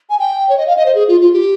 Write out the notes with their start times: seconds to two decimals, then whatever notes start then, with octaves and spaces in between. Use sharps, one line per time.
0.10 G#5
0.19 G5
0.49 C#5
0.57 D#5
0.67 F5
0.77 D#5
0.86 C5
0.95 G#4
1.08 F4
1.20 F4
1.33 G4